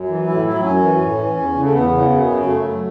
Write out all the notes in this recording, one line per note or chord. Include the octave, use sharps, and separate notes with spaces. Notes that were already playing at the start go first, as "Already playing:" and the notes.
Already playing: F#2
E3
A2 E4
F#3 E4
F#2 C#4
E3
A2
E3
E2
C#3
A3
E2 B3
C#3
F#2
C#3
F#2 A3
F#3